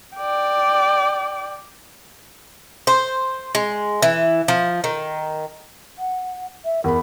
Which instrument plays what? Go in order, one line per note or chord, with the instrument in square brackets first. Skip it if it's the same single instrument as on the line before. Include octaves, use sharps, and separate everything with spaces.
[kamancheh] D5 G5
[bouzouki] C5
G#3
E3
F3
D#3
[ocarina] F#5
E5
[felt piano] E2 B5 [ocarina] A#4